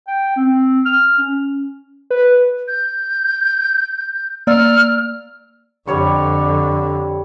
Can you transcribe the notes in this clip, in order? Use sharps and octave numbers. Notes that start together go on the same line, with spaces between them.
G5
C4
F6
C#4
B4
G6
A#3 D5 E6 F6
F2 D3 G3 C#5 C#6